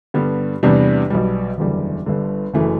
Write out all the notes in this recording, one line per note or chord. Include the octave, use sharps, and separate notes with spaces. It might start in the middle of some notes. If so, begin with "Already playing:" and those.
G2 D3 G3 B3
E2 C3 G3 B3 D4
B1 B2 G3
F#1 E2 D3 G3
G1 G2 D3
F#1 F#2 E3 A3